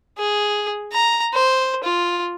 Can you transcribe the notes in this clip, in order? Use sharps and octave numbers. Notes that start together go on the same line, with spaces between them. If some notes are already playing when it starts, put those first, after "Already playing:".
G#4
A#5
C5
F4